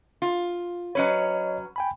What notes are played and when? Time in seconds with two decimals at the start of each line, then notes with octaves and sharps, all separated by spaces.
0.22 F4
0.95 F#3 C#4 B4 C#5 D#5
1.76 G5 G#5 B5